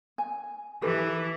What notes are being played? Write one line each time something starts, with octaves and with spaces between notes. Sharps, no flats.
G#5
E3 G4 A4 B4